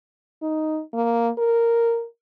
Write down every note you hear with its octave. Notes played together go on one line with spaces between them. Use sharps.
D#4
A#3
A#4